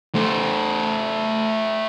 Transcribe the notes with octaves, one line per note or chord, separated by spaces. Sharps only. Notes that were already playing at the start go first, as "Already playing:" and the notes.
A3 C5